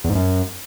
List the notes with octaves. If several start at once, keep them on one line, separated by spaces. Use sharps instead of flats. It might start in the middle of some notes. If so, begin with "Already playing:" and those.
E2
G#2
F#2